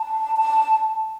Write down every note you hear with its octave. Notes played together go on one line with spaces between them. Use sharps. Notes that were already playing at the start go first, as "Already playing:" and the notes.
Already playing: A5
A5